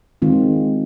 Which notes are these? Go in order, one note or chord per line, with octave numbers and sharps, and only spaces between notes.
D#3 G#3 C4 F4